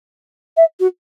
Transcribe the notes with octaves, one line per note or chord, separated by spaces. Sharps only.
E5
F#4